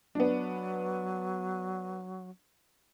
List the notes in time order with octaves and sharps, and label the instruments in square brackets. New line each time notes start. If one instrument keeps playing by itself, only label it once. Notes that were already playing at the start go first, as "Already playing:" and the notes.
[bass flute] F#3 [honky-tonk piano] B3 D4